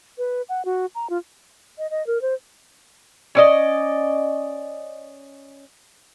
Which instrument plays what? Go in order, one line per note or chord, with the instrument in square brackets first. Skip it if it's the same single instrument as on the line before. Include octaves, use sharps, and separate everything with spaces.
[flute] B4
F#5
F#4
A#5
F4
[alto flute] D#5
D#5
A#4
C5
[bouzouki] C#4 D5 D#5